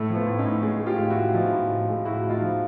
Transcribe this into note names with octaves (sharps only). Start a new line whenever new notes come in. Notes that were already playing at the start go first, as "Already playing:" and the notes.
Already playing: A2 A3
F3
A3 B3
A2
C#4 D#4
A2
G#3
G#3
F4 G4
A2
E4 F#4
A2
F3 D#4 F4
A2
A2
G#3
A2 E4 F#4
A2
D#4 F4
F3